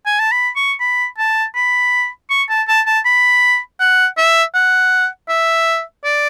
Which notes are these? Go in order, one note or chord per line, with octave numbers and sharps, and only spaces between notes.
G#5
A5
B5
C#6
B5
A5
B5
C#6
A5
A5
A5
B5
F#5
E5
F#5
E5
D5